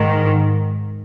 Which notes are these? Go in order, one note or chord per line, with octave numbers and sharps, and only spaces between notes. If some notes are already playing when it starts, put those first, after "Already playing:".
Already playing: G#2 D#3